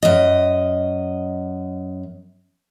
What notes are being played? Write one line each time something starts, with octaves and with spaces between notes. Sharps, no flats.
F#2 D#5